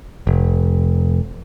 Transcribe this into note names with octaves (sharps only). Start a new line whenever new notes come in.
F1